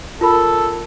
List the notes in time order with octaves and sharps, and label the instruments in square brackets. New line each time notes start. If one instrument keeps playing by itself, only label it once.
[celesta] F4 A#4 B5 [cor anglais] A4